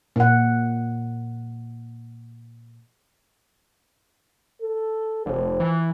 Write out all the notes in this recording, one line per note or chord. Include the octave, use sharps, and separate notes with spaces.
A#2 F#5
A4
F1 F3
E3